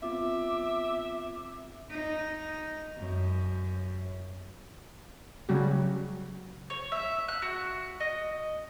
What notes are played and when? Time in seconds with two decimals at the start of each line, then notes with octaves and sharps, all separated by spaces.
0.02 B3 C4 F4 E5 D6
1.91 D#4
2.97 F#2
5.49 C#3 F#3 G3 F#4
6.70 C#5
6.92 E5
7.28 F#6
7.42 F#4
8.00 D#5